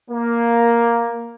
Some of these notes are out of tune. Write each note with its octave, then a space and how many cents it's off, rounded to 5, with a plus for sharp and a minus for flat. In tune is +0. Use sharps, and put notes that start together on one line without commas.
A#3 +5